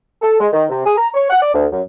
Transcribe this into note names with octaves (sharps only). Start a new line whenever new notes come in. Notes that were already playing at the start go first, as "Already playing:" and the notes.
A4
G#3
D#3
C3
G#4
A#5
C#5
F#5
D5
D2
F#2